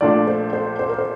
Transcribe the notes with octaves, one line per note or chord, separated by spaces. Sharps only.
A#1 A#2 A3 D4 F4 D5
C5
C5
C5
A#4
C5